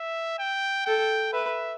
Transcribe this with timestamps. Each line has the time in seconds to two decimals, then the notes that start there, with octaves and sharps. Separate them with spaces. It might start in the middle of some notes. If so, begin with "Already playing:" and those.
Already playing: E5
0.39 G5
0.86 A4 G5
1.33 B4 E5